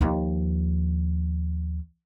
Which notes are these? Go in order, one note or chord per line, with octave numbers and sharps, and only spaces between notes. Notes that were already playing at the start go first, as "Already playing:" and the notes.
D#2 F3